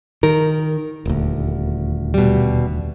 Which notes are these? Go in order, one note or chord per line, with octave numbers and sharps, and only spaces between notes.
D#3 A#4
D#1 D2
B2 G3